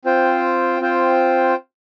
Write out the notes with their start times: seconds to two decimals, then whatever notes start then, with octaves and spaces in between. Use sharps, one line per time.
0.05 C4 F4 C5 G5
0.80 C4 F4 C5 G5